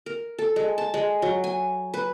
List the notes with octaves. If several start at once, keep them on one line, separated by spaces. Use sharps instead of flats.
A#4
A4
G#3
A5
G#3
F#3
G#5
B4